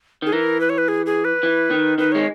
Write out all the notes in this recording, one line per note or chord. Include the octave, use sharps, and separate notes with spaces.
D#3 G#4
E3 A#4
B4
C#5
B4
G#4
G#4
B4
E3
D#3
D#3 B4
G#3 C#5